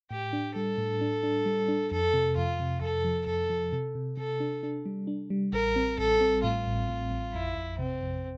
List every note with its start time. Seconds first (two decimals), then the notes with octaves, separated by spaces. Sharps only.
0.11 A2 G4
0.33 D4
0.55 G3 A4
0.78 A2
1.01 D4
1.23 D4
1.46 G3
1.68 D4
1.91 F2 A4
2.14 C3
2.36 F2 F4
2.60 C3
2.81 F2 A4
3.05 F3
3.27 F2 A4
3.50 F3
3.72 C3
3.95 C3
4.17 C3 A4
4.40 D4
4.63 D4
4.86 G3
5.07 D4
5.30 G3
5.53 A1 A#4
5.76 C4
5.98 A1 A4
6.21 C4
6.44 A2 F4
6.67 A1
6.89 A2
7.11 A1
7.34 F2 E4
7.56 F2
7.79 C3 C4
8.01 F2